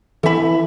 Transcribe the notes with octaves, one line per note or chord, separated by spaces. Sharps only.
E3 A4 E5 B5